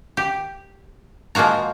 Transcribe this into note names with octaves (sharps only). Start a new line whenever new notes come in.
G4
F3 G#3 A#3 F#4 A#5